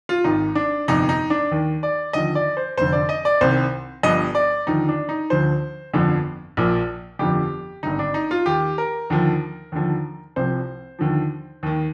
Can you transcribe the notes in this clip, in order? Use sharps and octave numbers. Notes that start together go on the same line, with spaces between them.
F4
G#1 G#2 D#3 D#4
D4
G1 F2 C3 D#4
D#4
D4
D#2 D#3
D5
D#2 D3 F3 D#5
D5
C5
F1 F2 D3 C5
D5
D#5
D5
C2 C3 D#3 C5
G1 G2 F3 D#5
D5
D#2 D3 F3 D#4
D4
D#4
D2 D3 F3 C5
G1 F2 D3 F3
A#1 A#2 F3
G1 F2 D3 F3 G4
G#1 G2 D3 D#4
D4
D#4
F4
D#2 D#3 G4
A#4
D#2 D3 F3
D#2 D3 F3
C2 C3 F3 C5
D#2 D3 F3
D#2 D#3